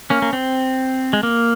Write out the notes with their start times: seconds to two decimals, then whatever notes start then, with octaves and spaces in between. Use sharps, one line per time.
0.10 A#3 C#4
0.22 A#3
0.33 C4
1.13 G#3
1.23 A#3